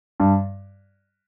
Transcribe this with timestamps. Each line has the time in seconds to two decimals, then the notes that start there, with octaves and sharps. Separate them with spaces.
0.20 G2